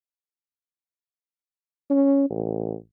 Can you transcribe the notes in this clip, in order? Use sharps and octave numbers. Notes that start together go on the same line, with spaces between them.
C#4
A1